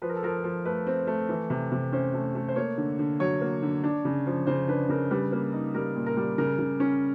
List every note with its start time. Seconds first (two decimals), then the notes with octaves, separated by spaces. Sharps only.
0.02 F3 B4
0.09 A#4
0.16 A4
0.23 F3 A#4
0.44 F3
0.65 A3 B4
0.87 C4
1.07 A3
1.29 E3
1.50 C3
1.72 C3
1.92 C#4 C5
2.14 A3
2.35 A3
2.48 C5
2.56 A#3 C#5
2.78 D3
2.99 D3
3.20 F#3 C#5
3.41 A#3
3.62 D3
3.84 D4
4.05 C#3
4.27 F3
4.47 C#3 C5
4.68 D4 B4
4.89 C#3 A#4
5.11 G3 B4
5.32 A#3
5.53 D#4
5.74 G3 A#4
5.96 A#2
6.06 A#4
6.17 G3
6.38 C#3 A#4
6.59 C#3
6.80 C#4